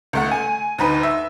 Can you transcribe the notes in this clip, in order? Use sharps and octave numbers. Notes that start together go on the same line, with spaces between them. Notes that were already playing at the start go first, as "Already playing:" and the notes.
C#2 A3 F#5
G#5
D2 D#4 B4
E5